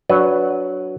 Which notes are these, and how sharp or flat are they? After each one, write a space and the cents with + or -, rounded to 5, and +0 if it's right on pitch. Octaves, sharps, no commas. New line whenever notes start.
F#3 +0 D4 -15 B4 +0